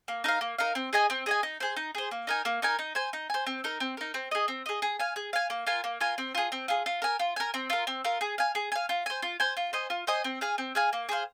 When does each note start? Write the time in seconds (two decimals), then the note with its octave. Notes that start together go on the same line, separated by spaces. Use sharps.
0.08 A#3
0.24 D#4 A#4 F5
0.41 A#3
0.58 D#4 A#4 F5
0.75 C4
0.93 G#4 D#5 G#5
1.10 C4
1.26 G#4 D#5 G#5
1.43 D#4
1.60 G#4 C5
1.76 D#4
1.95 G#4 C5
2.11 A#3
2.27 D#4 A#4 G#5
2.45 A#3
2.62 D#4 A#4 G#5
2.79 D#4
2.95 C5 G#5
3.13 D#4
3.30 C5 G#5
3.47 C4
3.64 D#4 A#4
3.80 C4
3.97 D#4 A#4
4.14 C4
4.31 G#4 D#5
4.48 C4
4.66 G#4 D#5
4.82 G#4
4.99 F5 G#5
5.16 G#4
5.33 F5 G#5
5.50 A#3
5.67 F4 A#4 G#5
5.84 A#3
6.01 F4 A#4 G#5
6.18 C4
6.35 F4 G#4
6.52 C4
6.68 F4 G#4
6.86 F4
7.02 A#4 G#5
7.19 F4
7.36 A#4 G#5
7.54 C4
7.70 F4 A#4
7.87 C4
8.04 F4 A#4
8.21 G#4
8.38 F5 G#5
8.55 G#4
8.72 F5 G#5
8.89 F4
9.06 C5 G#5
9.22 F4
9.40 C5 G#5
9.57 F4
9.73 C5 D#5 G#5
9.90 F4
10.07 C5 D#5 G#5
10.24 C4
10.41 G#4 F5 G#5
10.58 C4
10.75 G#4 F5 G#5
10.93 A#3
11.09 G#4 C5 F5